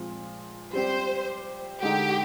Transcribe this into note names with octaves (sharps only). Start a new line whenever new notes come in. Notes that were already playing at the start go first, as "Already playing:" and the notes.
Already playing: A#2 F3 G#3 C4 F4
G3 C4 G4 C5
D3 G#3 D#4 G4